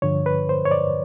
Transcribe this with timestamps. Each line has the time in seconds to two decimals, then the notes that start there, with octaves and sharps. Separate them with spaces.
0.02 G2 D3 F3 C#5
0.26 B4
0.49 C5
0.65 C#5
0.71 D5